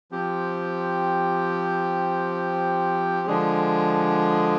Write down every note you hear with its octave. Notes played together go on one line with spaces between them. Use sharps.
F3 C4 G4
D3 F3 G#3 D4 G#4